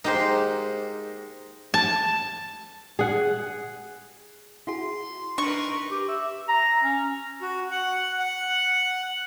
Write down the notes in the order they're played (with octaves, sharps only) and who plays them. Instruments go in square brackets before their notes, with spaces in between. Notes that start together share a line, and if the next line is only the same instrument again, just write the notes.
[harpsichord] G#2 A#3 [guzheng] D#4 G4 C5
[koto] A5
[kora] G#4 F#5
[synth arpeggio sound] E4 F#4 G#4 [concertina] C6
[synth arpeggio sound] D4 [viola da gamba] D#4 A#4 B4 [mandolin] C#6
[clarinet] G4
E5
A#5
C#4
[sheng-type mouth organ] F#4
F#5
F#5